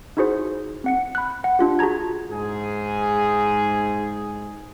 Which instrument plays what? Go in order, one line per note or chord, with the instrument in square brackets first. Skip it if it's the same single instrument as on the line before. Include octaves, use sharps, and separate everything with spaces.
[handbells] D#4 E4 F#4 G#4 C5
C4 F#5 C#7
B5 F#6
F#5
D4 F4 G4
F#4 G#4 A5 A#5 G#6
[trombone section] G#2 G#4